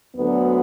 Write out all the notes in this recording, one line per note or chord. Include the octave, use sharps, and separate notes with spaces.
D2 D3 F#3 B3